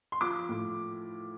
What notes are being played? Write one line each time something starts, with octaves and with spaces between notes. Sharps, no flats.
C6
F3 D6
A2